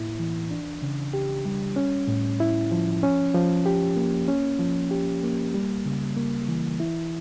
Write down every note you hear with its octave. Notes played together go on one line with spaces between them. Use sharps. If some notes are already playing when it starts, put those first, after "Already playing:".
Already playing: A2 A#3 E4
E3
D4
C#3
G4
G3
C#4
A2
E4
F3
C#4
F3
G4
A#3
C#4
F3
G4
A#3
G3
C#3
A#3
E3
E4